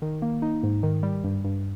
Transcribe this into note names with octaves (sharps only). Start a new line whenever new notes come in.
D#3
A#3
D#4
G#2
D#3
G3
G2
G2